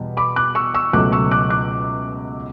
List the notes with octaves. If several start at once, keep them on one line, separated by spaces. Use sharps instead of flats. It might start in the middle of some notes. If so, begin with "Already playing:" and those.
Already playing: E2 B2 G3
B5 D6
D6 F#6
C#6 E6
C#6 E6
C#2 B2 F#3 A3 D6 F#6
C#6 E6
D6 F#6
D6 F#6